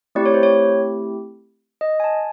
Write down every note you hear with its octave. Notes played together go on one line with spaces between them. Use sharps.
A3 C4 E4 G4 D5
C#5
C5
C#5
D#5
G#5
A5